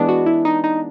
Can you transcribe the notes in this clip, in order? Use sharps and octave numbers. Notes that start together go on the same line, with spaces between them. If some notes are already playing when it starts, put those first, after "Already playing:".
Already playing: E3 G#3 B3 D4
F#4
E4
D#4
D#4